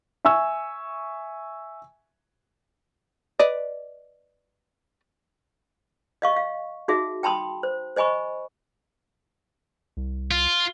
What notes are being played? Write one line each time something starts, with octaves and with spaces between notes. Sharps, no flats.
E5 G#5 C#6 E6
B4 D5 D#5
D#5 F5 C#6
F5
D#4 F#4 G#4 E5
G5 A5 B5 C6 D#6
C5
C5 D#5 G#5 B5 C#6
C2
F4